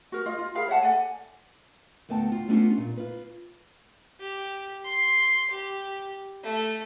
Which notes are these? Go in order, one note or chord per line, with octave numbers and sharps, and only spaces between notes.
F#4 A#4
F4 D#5
F4
G#4 A#4 F5 B5
C#5 E5 F#5 A5
A4 D5 F#5 G#5
D2 A3 B3 G5 A5
F4
A3 B3 C#4 D4 F4 G4
A#2
F4 B4
G4
C6
G4
A3